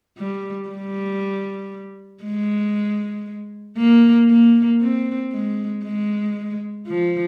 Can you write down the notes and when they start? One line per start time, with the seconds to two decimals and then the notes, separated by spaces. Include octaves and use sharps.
0.18 G3
0.69 G3
2.24 G#3
3.78 A#3
4.30 A#3
4.81 C4
5.33 G#3
5.84 G#3
6.87 F3